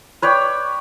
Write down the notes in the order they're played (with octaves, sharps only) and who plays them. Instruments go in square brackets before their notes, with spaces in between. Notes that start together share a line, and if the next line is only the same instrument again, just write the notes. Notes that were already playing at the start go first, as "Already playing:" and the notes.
[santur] B4 C#5 D5 G5